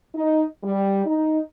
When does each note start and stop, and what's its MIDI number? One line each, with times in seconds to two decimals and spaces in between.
0.15 0.44 63
0.63 1.03 55
1.06 1.39 63